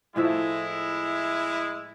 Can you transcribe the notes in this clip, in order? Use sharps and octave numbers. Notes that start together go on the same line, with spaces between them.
A2 F3 G#3 E4 E5